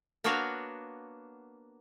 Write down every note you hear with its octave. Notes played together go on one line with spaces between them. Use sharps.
A#3 B3 D4 F#4 C#5 F5